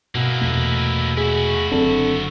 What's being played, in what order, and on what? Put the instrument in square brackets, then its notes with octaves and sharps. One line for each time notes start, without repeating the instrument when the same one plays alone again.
[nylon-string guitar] B2 [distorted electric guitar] A#3 E4
[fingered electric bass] E2 C3 A3
[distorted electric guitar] E4 F#4 [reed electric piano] G#4
[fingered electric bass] F#1 D3 F#3 [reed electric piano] C4 D4 A4